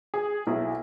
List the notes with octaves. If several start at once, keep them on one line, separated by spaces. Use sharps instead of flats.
G#4
B1 E4